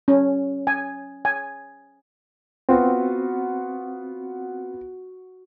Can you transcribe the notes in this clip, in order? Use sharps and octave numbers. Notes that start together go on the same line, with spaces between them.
C#4
G#5
G#5
B3 C4 F4 F#4